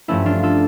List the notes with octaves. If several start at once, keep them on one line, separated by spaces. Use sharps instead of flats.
G2 F3 A3 C#4 E4
D4 F4
F4 A4